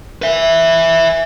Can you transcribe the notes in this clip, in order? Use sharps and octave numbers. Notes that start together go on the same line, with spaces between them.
B4 E5